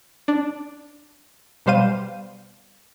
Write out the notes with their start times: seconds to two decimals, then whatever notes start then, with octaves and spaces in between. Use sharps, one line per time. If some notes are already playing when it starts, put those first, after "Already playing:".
0.28 D4
1.66 B2 G3 C5 F5 D#7